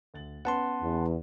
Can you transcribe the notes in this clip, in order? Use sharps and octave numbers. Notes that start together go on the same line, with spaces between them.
D2 A6 F#7
B3 C#4 B4 F#5 A5 C6
E2